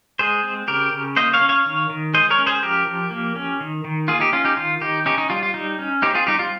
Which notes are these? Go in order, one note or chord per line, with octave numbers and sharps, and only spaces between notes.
G#3 G#4 C5
C4
C#3 G4 A#4
C#3
A#3 C5 D#5
C#5 F5
C#4
C#5 F5
D#3
D#3
G#3 C5 D#5
A#4 C#5
C#4
G#4 C5
F3 G4 A#4
F3
A#3
C#4
D#3
D#3
A#3 F4 G#4
D#4 G4
C#4 F4
D#4 G4
D#3 F4
D#3 D#4 G4
C#4 D#4 G4
D#4
G3 F4
F4
G3 D#4
C#4
C4 D#4 G4
F4 G#4
G3 D#4 G4
F4